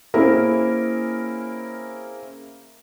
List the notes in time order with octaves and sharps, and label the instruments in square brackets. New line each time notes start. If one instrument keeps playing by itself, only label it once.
[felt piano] A#3 C4 C#4 E4 G#4 A#4